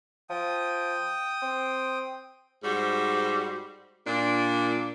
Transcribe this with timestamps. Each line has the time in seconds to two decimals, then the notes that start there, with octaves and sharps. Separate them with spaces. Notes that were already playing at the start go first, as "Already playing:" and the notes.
0.30 F3 G5 D#6
1.42 C4
2.64 G#2 G3 F#4 C5
4.06 A#2 D4